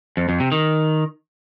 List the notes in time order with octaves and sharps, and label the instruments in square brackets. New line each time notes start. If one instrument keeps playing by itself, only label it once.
[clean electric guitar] F2
F2
C3
D#3